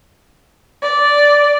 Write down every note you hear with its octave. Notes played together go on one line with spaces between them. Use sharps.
D5